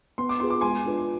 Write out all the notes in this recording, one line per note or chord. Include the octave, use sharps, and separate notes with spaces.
B3 C6
D6
F4 G#4 B4 C6
D6
G#3 G#5 C6
D4 F4 B4